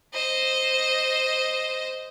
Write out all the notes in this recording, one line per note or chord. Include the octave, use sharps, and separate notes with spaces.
C5 D#5